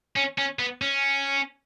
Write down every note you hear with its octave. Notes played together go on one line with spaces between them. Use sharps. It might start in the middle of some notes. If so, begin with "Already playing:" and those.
C#4
C#4
B3
C#4